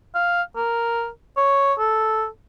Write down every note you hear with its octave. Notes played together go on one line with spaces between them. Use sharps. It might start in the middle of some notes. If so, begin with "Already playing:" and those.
F5
A#4
C#5
A4